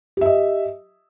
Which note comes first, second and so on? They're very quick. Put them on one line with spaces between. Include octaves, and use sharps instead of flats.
G4 E5 D#5